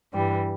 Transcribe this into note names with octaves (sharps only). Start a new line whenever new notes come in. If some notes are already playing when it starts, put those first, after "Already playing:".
G2 E3 G3